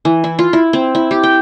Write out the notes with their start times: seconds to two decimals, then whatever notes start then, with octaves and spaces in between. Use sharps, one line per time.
0.05 E3
0.24 E4
0.39 F4
0.53 E4
0.73 C4
0.95 E4
1.11 G4
1.23 G5